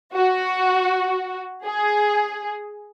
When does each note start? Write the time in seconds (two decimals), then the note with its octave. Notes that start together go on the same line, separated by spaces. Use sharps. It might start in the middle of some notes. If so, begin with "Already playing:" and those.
0.13 F#4
1.64 G#4